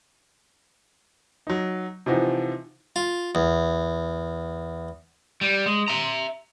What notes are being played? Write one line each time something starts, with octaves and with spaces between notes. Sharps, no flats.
F#3 D#4
C3 E3 F3 D#4 F#4
F4
E2
G3
G#3
E5 A#5